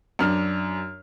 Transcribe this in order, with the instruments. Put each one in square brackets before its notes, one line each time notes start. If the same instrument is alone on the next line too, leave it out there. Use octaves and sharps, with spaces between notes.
[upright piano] F#2 D4 F6